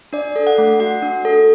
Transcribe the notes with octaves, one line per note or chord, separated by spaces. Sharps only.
D4 D5
A4
F#5
A3
F#4 F#5
D4
A4